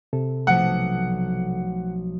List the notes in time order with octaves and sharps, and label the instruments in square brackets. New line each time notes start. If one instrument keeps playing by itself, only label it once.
[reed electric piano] C3 A4
[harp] B1 F3 A3 [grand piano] F#5